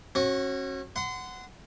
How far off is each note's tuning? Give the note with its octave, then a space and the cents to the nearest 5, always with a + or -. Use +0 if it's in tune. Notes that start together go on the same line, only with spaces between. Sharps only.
C#4 -35 F#4 +0
F#5 +0 C6 -30